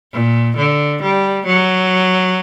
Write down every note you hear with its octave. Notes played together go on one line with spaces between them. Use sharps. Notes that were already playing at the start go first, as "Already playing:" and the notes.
A#2
D3
G3
F#3